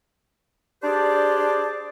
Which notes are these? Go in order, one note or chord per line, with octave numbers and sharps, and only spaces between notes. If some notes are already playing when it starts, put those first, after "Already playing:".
D4 G4 G#4 C5 D5